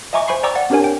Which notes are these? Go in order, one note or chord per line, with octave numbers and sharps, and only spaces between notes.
D#5 E5 G#5 A#5 C#6 D6
C5 G#5 B5 C#6 C7
D5 G5 A#5 C#6 D6 E6
D5 F#5 A6
C4 D4 G4 A#4 C#5 G#5
G5